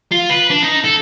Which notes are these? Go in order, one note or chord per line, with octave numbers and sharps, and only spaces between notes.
F4
B4
D4
D#4
A4